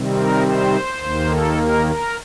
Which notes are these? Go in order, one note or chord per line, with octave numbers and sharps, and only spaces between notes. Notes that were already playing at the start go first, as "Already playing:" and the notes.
Already playing: C3 D#3 G3 C4
A#4
C5
D#2 D#3 A#3
A4
A#4
A#4